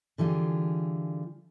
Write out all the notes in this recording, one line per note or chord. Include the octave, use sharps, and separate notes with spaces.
D3 E3 G3 F4 G#4